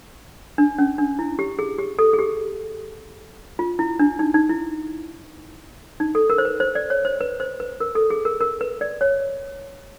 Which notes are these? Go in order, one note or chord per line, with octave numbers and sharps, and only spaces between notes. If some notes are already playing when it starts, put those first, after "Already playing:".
D4
C#4
D4
E4
G4
G#4
G4
A4
G#4
G4
F4
E4
D4
D#4
D#4
E4
D#4
A4
A#4
C5
B4
C5
D5
C#5
C5
B4
C5
B4
A#4
A4
G#4
A#4
A#4
B4
D5
C#5